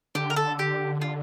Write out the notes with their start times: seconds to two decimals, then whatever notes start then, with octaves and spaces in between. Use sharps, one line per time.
0.15 D3 G4
0.30 A#4
0.36 A4
0.59 G4
1.02 F4